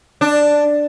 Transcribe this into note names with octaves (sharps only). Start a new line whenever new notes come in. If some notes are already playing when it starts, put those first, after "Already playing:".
D4